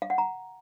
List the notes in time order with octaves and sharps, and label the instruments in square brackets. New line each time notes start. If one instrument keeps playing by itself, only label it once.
[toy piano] F5
F#5
A#5